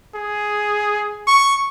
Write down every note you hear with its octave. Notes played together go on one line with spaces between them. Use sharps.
G#4
C#6